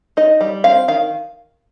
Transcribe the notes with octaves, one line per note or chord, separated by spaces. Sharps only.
D#4 D#5
G3
C4 F5
D#3 F5